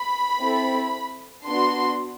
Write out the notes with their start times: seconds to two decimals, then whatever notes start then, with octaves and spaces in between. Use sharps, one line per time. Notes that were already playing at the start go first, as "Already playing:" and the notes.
Already playing: B5
0.41 C4 E4 A4
1.47 B3 D4 F#4 C6